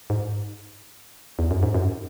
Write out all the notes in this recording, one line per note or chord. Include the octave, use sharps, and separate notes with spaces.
G#2
E2
F#2
G#2
F#2